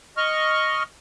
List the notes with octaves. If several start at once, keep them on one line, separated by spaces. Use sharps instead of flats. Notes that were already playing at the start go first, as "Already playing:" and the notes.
D#5 C#6 F6